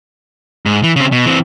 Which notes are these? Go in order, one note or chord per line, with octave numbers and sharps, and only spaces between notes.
G#2
E3
C#3 C4
B2
E3 C4